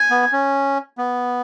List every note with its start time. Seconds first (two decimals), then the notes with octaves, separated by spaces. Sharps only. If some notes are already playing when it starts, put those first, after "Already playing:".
Already playing: G#5
0.10 B3
0.32 C#4
0.98 B3